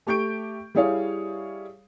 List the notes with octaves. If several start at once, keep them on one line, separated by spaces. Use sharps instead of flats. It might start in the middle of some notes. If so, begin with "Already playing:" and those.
A3 G4 C#6 G6 D7
G3 E4 G#4 C#5 F5